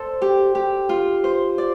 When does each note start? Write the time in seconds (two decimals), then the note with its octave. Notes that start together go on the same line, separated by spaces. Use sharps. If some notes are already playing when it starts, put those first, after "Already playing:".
Already playing: A4 C5 D5
0.22 G4
0.55 G4
0.89 F4
1.24 C5
1.58 D5